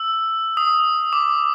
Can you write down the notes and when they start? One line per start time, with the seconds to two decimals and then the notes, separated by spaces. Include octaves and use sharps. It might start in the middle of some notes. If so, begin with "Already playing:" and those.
Already playing: E6
0.57 D#6
1.13 D6